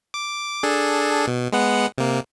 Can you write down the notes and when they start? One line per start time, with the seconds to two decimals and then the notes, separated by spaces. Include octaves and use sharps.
0.14 D6
0.63 D4 G#4 A4
1.27 B2
1.52 G#3 B3 F#5
1.98 C3 A#3